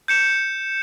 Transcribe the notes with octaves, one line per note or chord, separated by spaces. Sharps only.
G6 C#7 E7